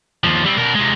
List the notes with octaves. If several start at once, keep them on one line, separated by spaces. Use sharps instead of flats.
D#2 F3
G3 C4
B2 A#4
C3 G#3